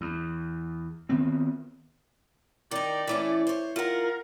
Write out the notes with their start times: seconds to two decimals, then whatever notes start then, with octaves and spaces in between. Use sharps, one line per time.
0.01 E2
1.09 D#3 B3 C4
2.71 D#3 D#4 D5
3.07 E3 A3 C#4
3.47 C5 C#5
3.76 F4 A#4 F#5